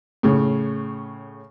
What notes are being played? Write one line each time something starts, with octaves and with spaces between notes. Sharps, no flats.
A2 C#3